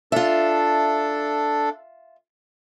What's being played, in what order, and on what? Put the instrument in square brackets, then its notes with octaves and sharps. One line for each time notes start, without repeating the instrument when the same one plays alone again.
[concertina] D4 A4 [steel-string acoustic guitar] F4 E5